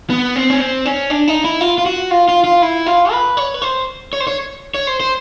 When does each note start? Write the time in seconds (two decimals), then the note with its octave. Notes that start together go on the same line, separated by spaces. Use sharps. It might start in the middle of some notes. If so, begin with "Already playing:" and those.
0.10 B3
0.36 C4
0.50 C#4
0.60 C4
0.86 C#4
1.10 D4
1.28 D#4
1.44 E4
1.61 F4
1.78 F4
1.86 F#4
2.11 F4
2.28 F4
2.44 F4
2.62 E4
2.86 F4
3.12 B4
3.37 C#5
3.54 B4
3.62 C5
4.13 C#5
4.20 C5
4.27 C#5
4.74 C#5
4.87 C5
5.00 C5